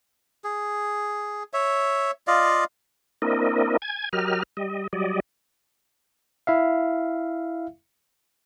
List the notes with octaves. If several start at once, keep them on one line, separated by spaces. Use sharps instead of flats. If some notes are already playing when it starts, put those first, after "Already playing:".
G#4
C#5 E5
F4 D5 D#5 F5
A#3 C4 D4 E4 A#4 D#5
G#5 G#6
F#3 G4 A#4 D#5 F6
G3 D#5
F#3 G3 D5 D#5
E4 E5 F5